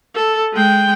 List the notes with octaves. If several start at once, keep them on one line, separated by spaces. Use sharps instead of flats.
A4
G#3 G5